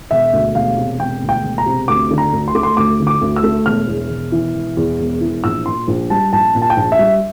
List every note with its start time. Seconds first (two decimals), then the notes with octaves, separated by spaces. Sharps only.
0.11 E1 E5
0.33 D2
0.55 E1 F5
0.77 C3
0.99 E1 G5
1.22 D2
1.29 G5
1.44 E1
1.58 A#5
1.66 C3
1.88 D2 D6
2.11 D3
2.18 A#5
2.33 D2
2.48 C6
2.55 A3 D6
2.63 C6
2.77 D2 D6
3.00 D3
3.07 D6
3.21 D2
3.36 E6
3.43 A3
3.66 E1 F6
3.88 E2
4.10 E1
4.32 E3
4.55 E1
4.77 E2
4.99 E1
5.21 E3
5.44 A#1 E6
5.66 A#2 C6
5.88 A#1
6.10 G3 A5
6.33 A#1 A5
6.55 A#2
6.62 A5
6.70 G5
6.77 A#1 A5
6.92 E5
6.99 G3